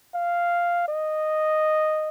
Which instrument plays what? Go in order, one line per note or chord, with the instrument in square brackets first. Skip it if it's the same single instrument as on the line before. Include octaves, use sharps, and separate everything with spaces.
[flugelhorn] F5
D#5